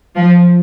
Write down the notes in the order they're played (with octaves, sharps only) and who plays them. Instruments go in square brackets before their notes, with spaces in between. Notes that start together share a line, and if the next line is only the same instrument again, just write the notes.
[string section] F3